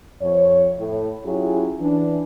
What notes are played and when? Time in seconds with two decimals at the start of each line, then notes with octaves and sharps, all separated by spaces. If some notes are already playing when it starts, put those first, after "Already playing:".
0.21 F2 C#5
0.78 A2
1.25 F#3 C#4 E4 F4 G4 G#4
1.80 E3 D4